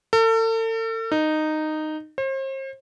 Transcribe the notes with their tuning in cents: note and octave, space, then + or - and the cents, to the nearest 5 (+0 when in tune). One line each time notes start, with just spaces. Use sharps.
A4 +40
D#4 -10
C5 +40